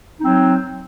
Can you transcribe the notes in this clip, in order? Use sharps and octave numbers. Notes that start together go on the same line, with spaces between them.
F#3 C4 D#4